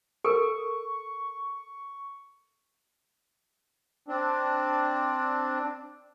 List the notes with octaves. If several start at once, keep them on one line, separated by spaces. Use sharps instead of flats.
A4 A#4 C#6
C4 D4